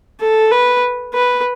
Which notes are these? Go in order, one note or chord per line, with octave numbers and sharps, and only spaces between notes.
A4
B4
B4